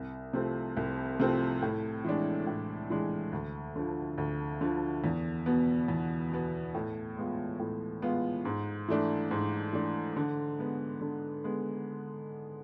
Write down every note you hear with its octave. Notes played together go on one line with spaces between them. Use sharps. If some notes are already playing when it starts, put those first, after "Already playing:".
Already playing: C2
C3 F3 A3 C4
C2
C3 F3 A3 C4
A2
E3 G#3 D4
A2
E3 G#3 D4
D2
D3 F3
D2
D3 F3
E2
B2 B3
E2
B2 B3
A2
G#3 B3 F4
A2
G#3 B3 F4
G#2
E3 A3 D4
G#2
E3 A3 D4
D3
G#3 B3
D3
G#3 B3